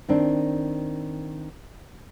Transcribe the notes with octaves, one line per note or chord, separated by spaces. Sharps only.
D#3 C4 D4